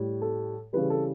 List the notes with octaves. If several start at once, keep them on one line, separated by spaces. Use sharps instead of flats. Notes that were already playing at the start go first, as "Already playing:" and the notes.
Already playing: A2 G3
A4
C#3 E3 G3 B4
A4